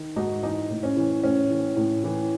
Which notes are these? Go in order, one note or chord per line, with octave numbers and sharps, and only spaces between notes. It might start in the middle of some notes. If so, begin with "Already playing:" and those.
Already playing: D#3
G#2 D#4 F#4
E3 D#4
A2
C#4
E3
A2 C#4
E3
A2
E3